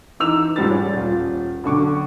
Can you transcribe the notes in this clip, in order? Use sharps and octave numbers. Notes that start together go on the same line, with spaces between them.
E3 D#4 E6 F7
G#2 F3 G3 A6
G#4 C#5 D5
D#1 F4
B1 D3 C#6 D6